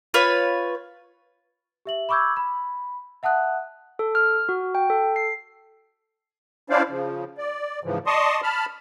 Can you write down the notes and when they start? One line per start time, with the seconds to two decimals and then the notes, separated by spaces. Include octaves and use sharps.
0.14 F4 B4 C#5
1.85 G4 E5 F#7
2.09 B5 C#6 D6 E6 G6 G#6
2.37 B5
3.23 E5 F#5 A5 D#6 F#6
3.99 A4
4.15 F6
4.49 F#4
4.75 G5
4.90 A4
5.16 C7
6.70 C#4 D4 E4 C5 D5 F5
6.89 C#3 F3
7.38 D5
7.84 G#2 C#3 E3 F3
8.07 D5 D#5 A5 C6 C#6 D#6
8.43 A5 B5 F6